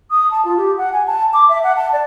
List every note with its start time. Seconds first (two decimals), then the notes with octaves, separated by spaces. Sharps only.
0.11 D#6
0.31 A5
0.45 F4
0.57 G4
0.78 F#5
0.93 G#5
1.07 A5
1.34 D6
1.49 E5
1.64 F#5
1.76 A5
1.93 D5